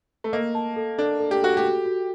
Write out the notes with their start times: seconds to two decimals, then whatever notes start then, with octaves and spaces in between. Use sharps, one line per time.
0.24 A3
0.33 A#3 D#5
0.55 A5
0.76 A4
0.98 D4 A4
1.20 A4
1.31 G4
1.42 F#4 A4
1.57 G4
1.64 F#4
1.85 F#4